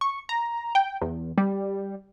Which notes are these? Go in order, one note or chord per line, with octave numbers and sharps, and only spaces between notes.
C#6
A#5
G5
E2
G3